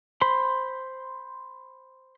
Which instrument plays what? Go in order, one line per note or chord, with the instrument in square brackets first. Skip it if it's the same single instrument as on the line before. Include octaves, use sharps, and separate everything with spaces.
[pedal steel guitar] C5 B5 C6